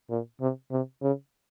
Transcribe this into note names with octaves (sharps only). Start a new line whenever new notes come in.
A#2
C3
C3
C#3